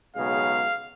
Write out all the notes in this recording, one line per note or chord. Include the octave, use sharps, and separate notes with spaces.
B1 C#3 G#3 F5